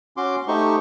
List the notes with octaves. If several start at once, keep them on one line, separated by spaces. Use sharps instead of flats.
C#4 F#4 C6 D6
A3 D#4 G4 C5 C#6